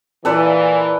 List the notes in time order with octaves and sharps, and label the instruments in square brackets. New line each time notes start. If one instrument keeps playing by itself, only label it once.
[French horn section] A#2 E3 [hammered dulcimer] A4 B4 D5